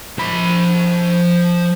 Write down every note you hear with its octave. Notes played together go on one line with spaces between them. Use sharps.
F3 B5